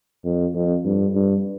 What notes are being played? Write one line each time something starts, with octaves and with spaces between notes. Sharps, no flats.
F2
F2
G2
G2